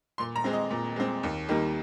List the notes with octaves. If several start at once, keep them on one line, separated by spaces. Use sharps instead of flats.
A#2 C6
A#5
G#3 C4
D#5
A#2
G#3 C4
D#2
D#3 G3 A#3